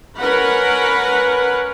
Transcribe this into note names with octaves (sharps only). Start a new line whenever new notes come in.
C#4 A#4 B4 F#5 B5